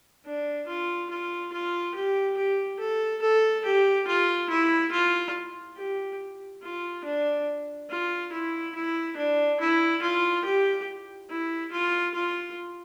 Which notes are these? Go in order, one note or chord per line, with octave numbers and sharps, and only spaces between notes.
D4
F4
F4
F4
G4
G4
A4
A4
G4
F4
E4
F4
G4
F4
D4
F4
E4
E4
D4
E4
F4
G4
E4
F4
F4